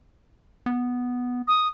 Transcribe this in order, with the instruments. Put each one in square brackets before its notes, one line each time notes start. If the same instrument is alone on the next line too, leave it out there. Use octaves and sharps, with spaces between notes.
[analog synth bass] B3
[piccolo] D#6